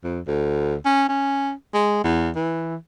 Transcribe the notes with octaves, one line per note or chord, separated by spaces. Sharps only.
F2
D2
C#4
C#4
G#3
E2
E3